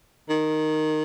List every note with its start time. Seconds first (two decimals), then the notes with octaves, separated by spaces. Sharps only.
0.29 D#3